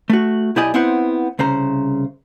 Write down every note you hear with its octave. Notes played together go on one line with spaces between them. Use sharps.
A3 F#4
B1 E4 G4 D5 D#5 G#5
B3 C4 E4 C5 F#5
C2 C#3 C5 A#5